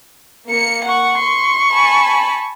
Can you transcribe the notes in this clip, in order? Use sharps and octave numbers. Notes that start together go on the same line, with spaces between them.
A#3 C#7
F#5 C#6
C6
G#5 A5 B5